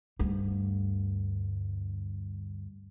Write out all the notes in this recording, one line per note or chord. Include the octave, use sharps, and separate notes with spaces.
D2 G2